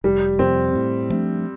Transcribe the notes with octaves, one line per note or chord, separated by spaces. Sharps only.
F1 G3
F2 C3 C4
A2
F3 A3 D4